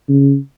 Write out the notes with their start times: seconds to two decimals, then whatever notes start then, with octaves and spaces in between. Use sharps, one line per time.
0.09 C#3